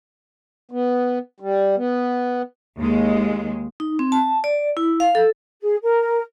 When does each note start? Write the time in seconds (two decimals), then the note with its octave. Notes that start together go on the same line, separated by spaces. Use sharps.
0.71 B3
1.40 G3
1.77 B3
2.80 D#2 G#3
3.80 D#4
3.99 C4
4.12 A5
4.44 D5
4.77 E4
5.00 F5
5.15 A4
5.62 G#4
5.82 A#4